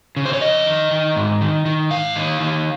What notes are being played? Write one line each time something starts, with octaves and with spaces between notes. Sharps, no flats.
C#3
C5
C#5
F2 D#5
D#3
D#3
G#2
D#3
D#3
G#2 F5
D#3
D#3